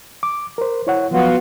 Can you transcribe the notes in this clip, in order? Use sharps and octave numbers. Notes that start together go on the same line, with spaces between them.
D6
A#4 C5
E4 C#5 F#5
F3 F#3 B3 F4 F#4